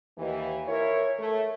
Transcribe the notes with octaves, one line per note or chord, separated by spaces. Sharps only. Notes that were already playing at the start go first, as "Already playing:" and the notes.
D#2 E3
E3 E4 A#4 C#5
A3